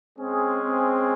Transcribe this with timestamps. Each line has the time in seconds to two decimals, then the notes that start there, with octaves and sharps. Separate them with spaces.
0.18 G#3 C4 C#4 G#4
0.63 C4